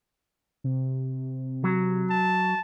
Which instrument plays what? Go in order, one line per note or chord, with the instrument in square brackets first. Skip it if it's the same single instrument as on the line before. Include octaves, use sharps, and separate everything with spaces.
[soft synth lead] C3
[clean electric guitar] F#3
[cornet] A5